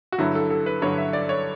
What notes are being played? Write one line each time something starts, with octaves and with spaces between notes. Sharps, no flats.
F#4
G2 D3 F#3 E4
A4
A4
B4
G2 D3 F#3 C#5
E5
D5
C#5